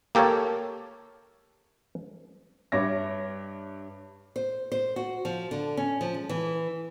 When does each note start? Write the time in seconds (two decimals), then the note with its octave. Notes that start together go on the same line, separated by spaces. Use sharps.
0.15 A#3 G4 A4 A#4 C#5
2.72 G2 C#5 E5 D6 A#6
4.36 C5
4.72 C5
4.96 F#4
5.25 F3
5.51 D3
5.77 C#4
6.01 F3
6.14 G#3
6.29 E3